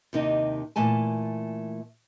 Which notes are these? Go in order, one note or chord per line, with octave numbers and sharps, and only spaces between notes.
D#2 C3 D#4 D#5
A#2 E3 A3 G#5 A5